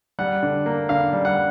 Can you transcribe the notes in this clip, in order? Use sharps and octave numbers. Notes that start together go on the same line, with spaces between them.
G3 F#5
D3
A#3
D3 F5
G3
F#5